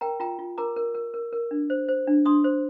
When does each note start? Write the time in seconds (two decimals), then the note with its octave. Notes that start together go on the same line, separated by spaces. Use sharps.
0.01 A#4 G5 A#5
0.20 F4 G5 A#5
0.39 F4
0.58 A#4 A#5 D6
0.76 A#4
0.95 A#4
1.14 A#4
1.33 A#4
1.51 D4
1.70 C5
1.88 C5
2.07 D4
2.25 D4 C6 D#6
2.44 C5